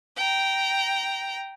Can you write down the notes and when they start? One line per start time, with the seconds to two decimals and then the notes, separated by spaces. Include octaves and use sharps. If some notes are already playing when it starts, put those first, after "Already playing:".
0.17 G5 A#5